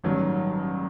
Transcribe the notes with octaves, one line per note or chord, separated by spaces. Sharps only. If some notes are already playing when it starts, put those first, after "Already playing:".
A1 G2 D#3 F#3